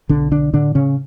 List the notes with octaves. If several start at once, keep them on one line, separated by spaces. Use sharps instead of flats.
B1 D3 D4
D3 D4
A2 D3 D4
C#3 C#4